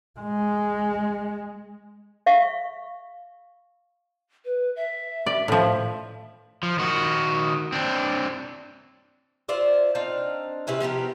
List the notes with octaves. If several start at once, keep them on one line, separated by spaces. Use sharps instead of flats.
G#3
E5 F5 C#6
B4
E5
D5
A2 F3
F3
D#3 F#4
C4 D4
F4 C5 D5 E5
C4 D4 D#4 F5
C3 C#4 E4 B4
F3 B3 G4 A#4